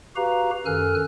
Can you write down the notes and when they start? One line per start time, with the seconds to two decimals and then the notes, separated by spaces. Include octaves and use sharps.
0.16 F#4 G4 B4 F5 A#5
0.66 F#2 D#3 A4 G#5 F6 F#6